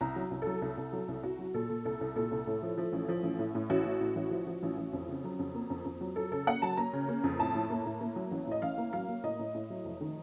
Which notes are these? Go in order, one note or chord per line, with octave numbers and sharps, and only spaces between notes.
C2 A#5
F#3
C2
A4
F#3
C2 A4
C2
F#3
C2
C2 F#4
F#3
A#2 A4
A#2
C2 A4
C2
A#2 A4
C2
A2
F3
F3
A1
F3
A1
A2
A2
A1 F#4
A2
A2
A1
F3
F3
A1
A1
F2
C#3
F#3
F2
A#3
F2
F2
F#3
F#3 A4
C#3 A4
A#3 F#5
F#3 A5
A#3 A#5
C#3
A#3
F2
A2 A5
A2
A#3
A2
A#3
F#3
A1
A2 D#5
A1 F5
A#3
F#3 F5
A#3
A2 D#5
A2
A2
F#3
F1
D#3